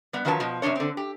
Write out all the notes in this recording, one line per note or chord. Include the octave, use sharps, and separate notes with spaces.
G3 B3
D#3 F3 F#3 B4 F#5 A5
B2 F3
F#2 C3 G#3 D4 C#5
D3 C4
G4